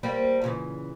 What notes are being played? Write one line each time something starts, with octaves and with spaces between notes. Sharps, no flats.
G3 A#3 C5
A#2 C#3 E3